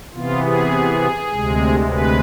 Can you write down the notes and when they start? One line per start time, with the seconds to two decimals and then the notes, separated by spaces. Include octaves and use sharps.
0.14 C3 E3 B3 F4
0.44 G#4
1.31 D2 C3 G#3
1.89 B4